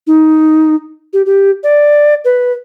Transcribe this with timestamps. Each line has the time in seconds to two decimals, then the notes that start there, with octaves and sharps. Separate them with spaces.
0.07 D#4
1.13 G4
1.26 G4
1.63 D5
2.25 B4